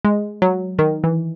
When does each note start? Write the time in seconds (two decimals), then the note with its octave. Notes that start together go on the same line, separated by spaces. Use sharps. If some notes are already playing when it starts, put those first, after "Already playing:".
0.05 G#3
0.42 F#3
0.79 D#3
1.04 E3